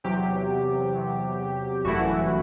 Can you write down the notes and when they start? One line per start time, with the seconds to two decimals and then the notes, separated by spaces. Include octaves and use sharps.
0.04 E2 C3 F#3 G4
0.95 E2 C3 F#3
1.84 G1 F#2 E3 A3 E4 F#4